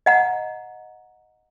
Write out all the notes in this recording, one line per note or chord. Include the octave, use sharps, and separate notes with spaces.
D#5 F#5 A#5